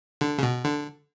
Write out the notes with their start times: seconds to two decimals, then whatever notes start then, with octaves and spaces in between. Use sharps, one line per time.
0.21 D3
0.38 C#3
0.43 B2
0.65 D3